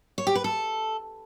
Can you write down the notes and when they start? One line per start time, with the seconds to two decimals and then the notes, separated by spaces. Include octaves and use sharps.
0.18 C#5
0.27 G4
0.35 B4
0.44 A4